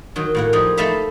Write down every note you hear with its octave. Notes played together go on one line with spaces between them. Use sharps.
D#3 F#3
A2 A#3 F#5
F3 G3 D#4 G#4
A3 D#4 A4 E5 F5 B5